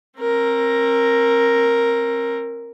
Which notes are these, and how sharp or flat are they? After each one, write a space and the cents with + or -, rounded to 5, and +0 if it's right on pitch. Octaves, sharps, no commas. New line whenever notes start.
C4 +35 A#4 +0